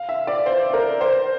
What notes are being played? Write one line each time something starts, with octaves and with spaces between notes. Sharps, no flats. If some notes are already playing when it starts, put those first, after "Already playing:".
Already playing: F5
E5
D5
C5
A#4
C5